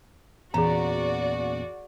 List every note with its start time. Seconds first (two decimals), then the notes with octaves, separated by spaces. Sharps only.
0.54 E2 A#2 C#4 F#4 G#4 D5 A#5